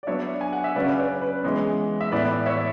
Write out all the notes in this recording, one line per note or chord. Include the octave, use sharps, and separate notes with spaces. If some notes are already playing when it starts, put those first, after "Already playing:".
D5
F#3 B3 D4 C#5 E5
G#5
F#5
E5
C#3 F#3 C#4 B4 D5
B4 D5
B4
E3 G#3 B3 C#5
E5
A2 E3 B3 B4 D5
C#5 E5